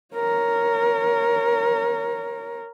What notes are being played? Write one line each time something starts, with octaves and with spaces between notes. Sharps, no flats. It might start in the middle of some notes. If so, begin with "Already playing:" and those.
A#4 C#5